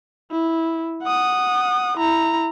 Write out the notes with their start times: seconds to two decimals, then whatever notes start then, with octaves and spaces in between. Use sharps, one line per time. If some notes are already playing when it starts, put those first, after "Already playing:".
0.31 E4
1.03 F#5 D#6
1.98 E4 A#5